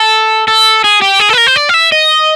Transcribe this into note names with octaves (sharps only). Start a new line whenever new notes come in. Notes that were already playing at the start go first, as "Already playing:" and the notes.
Already playing: A4
A4
G#4
G4
G#4
A4
B4
A#4
C5
D5
F5
E5
D#5